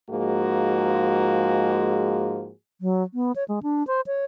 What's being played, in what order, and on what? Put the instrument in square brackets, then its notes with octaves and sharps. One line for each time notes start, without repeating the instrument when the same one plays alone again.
[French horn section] G#2 F3 G#3 A#3 F#4 G#4
[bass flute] F#3
B3
C#5
G#3
D4
C5
C#5